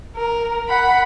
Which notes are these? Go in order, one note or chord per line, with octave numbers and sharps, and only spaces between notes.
A#4
F#5 B5